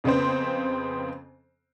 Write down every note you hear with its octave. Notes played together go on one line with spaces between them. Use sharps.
F2 C#3 B3 C4 C5